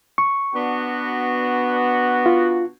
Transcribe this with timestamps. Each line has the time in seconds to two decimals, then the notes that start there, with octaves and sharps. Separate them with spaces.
0.18 C#6
0.55 B3 D4 F#4
2.26 F4